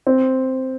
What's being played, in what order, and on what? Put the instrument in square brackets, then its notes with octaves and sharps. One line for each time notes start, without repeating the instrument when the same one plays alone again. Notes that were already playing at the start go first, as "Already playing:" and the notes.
[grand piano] C4